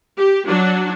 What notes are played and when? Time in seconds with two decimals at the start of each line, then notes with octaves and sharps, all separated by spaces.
0.17 G4
0.46 F#3 D4 F#4